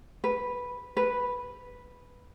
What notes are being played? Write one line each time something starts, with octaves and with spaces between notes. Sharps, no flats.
B4
B4